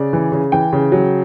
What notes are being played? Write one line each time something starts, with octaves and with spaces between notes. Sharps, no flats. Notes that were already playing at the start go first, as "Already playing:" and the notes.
Already playing: C#3 D5
E3
C#3
E3 G5
C#3
F#3